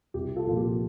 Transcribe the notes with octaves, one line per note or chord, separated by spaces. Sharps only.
C2 G4
F4 A4
A#2 F3 F4
G4